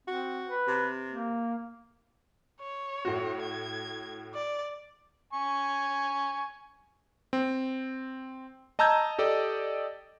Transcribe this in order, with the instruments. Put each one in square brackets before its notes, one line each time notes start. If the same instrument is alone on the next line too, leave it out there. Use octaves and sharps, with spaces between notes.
[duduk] C4 [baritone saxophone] F#4
[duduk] B4
[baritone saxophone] C3
[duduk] A#3
[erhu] C#5
[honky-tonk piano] A2 F#4
[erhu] G#6
D5
[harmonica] G#5 C#6
[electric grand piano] C4
D#5 A5 A#5 E6 G6 G#6
G4 A4 D5 D#5